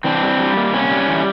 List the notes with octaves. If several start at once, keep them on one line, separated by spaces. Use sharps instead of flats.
E3 C4 D4
G3
G3
A#3
C3 C#4
G3
E3